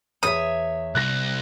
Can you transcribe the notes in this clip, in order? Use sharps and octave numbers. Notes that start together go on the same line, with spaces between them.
E2 C#5 E5 D#6
C2 F#6 A#6